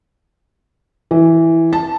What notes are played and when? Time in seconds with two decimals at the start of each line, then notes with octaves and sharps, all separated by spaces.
1.11 E3
1.73 A5